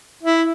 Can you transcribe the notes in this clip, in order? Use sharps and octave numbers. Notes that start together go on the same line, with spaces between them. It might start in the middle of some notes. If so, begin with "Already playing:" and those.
E4